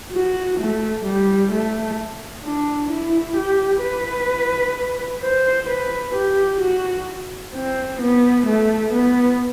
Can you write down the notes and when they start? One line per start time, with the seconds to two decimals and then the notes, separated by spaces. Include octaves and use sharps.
0.12 F#4
0.59 A3
1.05 G3
1.51 A3
2.43 D4
2.91 E4
3.37 G4
3.83 B4
5.23 C5
5.69 B4
6.14 G4
6.61 F#4
7.54 C4
8.00 B3
8.46 A3
8.93 B3